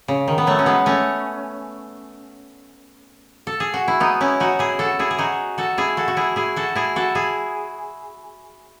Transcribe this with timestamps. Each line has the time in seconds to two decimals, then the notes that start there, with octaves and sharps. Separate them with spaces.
0.08 C#3
0.28 D#3
0.38 B3
0.47 F#3 A3
0.59 C#4
0.66 G#3 B3
0.86 A3 C#4
3.47 A4
3.60 G#4
3.74 F#4
3.88 E4
4.00 B3 D#4
4.21 C#4 E4
4.40 D#4 F#4
4.59 E4 G#4
4.79 F#4 A4
4.99 E4 G#4
5.11 G#4
5.18 D#4 F#4
5.58 F#4 A4
5.78 E4 G#4
5.97 F#4 A4
6.08 F#4
6.17 E4 G#4
6.36 E4 G#4
6.56 F#4 A4
6.75 E4 G#4
6.96 F#4 A4
7.15 E4 G#4